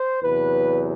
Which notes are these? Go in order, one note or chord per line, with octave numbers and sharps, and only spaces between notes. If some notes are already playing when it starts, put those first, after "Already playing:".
Already playing: C5
E2 C3 F#3 B4